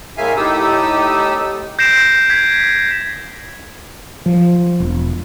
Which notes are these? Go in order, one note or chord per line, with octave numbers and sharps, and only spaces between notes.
A2 G#3 A#3 E5 F5 G#5
A2 D#4 G4 A4 D#6 E6
G6 A#6 C7 D7 E7
G#6 B6
F3
E1